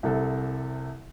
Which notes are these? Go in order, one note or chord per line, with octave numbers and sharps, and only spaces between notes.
C2 C3 A4